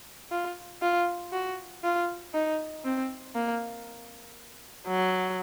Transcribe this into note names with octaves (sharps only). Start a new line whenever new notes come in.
F4
F4
F#4
F4
D#4
C4
A#3
F#3